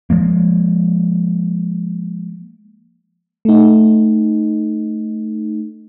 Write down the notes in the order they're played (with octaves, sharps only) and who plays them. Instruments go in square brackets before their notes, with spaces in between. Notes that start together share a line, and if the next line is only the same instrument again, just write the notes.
[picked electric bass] F3 G#3 A#3
[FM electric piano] A3 D#4